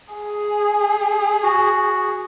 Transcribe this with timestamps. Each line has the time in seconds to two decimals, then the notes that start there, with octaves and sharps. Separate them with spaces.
0.14 G#4
1.44 F#4